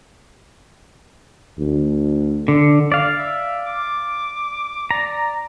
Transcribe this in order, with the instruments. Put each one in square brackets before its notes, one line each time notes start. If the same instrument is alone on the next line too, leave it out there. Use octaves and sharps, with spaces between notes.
[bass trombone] D2
[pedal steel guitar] D3
D5 F5
[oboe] E5
D6
[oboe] D5 [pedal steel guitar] A#5